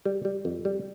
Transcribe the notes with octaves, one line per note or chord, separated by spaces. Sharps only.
G3
G3
F2
G3